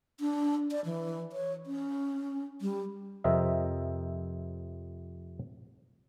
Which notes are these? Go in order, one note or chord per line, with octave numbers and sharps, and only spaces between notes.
D4
D5
E3
C#5
C#4
G3
F2 C3 C4 A#4 D#5 E5